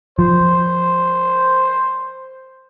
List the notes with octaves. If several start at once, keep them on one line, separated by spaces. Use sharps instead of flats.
F3 C5